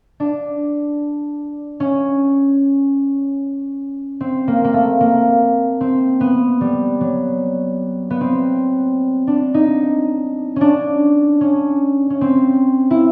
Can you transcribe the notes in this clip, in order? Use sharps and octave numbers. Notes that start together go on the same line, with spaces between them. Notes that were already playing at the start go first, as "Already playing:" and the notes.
D4
C#4
C4
A#3
A#3
A3
A#3
C4
B3
G3
F#3
B3
C4
D4
D#4
C#4 D4
C#4
C#4
C4
E4